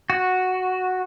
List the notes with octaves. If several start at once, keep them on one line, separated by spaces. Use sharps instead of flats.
F#4